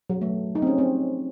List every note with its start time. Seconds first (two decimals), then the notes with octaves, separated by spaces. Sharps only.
0.10 F#3
0.21 A3
0.55 D#4
0.62 C4
0.67 C#4
0.78 C4